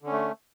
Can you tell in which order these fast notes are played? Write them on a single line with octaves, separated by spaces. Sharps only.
D3 C#4 A3